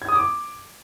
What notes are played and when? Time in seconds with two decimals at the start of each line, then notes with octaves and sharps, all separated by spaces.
0.02 G#6
0.09 D#6
0.15 D6